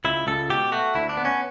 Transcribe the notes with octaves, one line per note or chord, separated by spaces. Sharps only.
C#2 E4
C#2 A4
B2 G4
A3 F#4
D2 E4
D4
B3
C#4